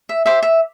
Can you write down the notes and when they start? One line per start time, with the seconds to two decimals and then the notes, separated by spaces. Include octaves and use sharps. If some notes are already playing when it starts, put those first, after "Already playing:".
0.09 E5
0.26 G4 C5 E5
0.43 E5